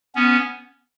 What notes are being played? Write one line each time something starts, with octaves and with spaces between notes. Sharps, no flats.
B3 C#4